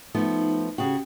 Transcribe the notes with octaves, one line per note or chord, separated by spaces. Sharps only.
F3 A3 B3 D#4
C#3 F#4 G4 G5